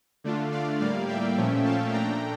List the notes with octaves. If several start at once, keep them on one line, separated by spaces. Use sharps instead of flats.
D3 A3 D4 F4
D5 F5
A2 G3 A#3 D5 F5
E5 G5
A#2 F3 A3 C#4
F5 A5
A#2 A3 D4 G5 A#5